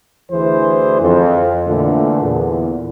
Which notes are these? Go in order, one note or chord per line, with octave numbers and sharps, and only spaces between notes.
D2 E3 G#4 C5
F2
A#2 D3 E3 A3
E2 A#2